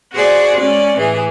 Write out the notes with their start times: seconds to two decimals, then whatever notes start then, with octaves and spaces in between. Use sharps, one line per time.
0.13 F#4 G#4 C5 D5
0.58 G#3 C#4 D5
0.97 A2 E3 G#4